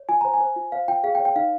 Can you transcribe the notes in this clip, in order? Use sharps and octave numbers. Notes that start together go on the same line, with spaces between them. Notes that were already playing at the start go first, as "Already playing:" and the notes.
Already playing: C#5
F4 G#5
C5 A#5
G#5
C5
F4
C5 F5
F4 G5
G#4 F5
G5
C#5
G5
D#4 F5